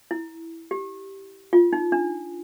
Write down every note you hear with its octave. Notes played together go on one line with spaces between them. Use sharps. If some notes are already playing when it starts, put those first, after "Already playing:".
E4
G4
F4
D#4
D4